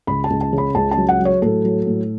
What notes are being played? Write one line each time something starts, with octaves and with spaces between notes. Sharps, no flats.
C#2 B5
A5
C#2
A5
C#3
B5
C#2 A5
A5
F#3
F#5
F#3
C#5
A2 A4
F#3
A2